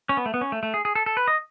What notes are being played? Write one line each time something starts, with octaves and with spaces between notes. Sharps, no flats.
C#4
B3
A3
B3
C#4
A3
A3
G#4
G#4
A4
A4
B4
D#5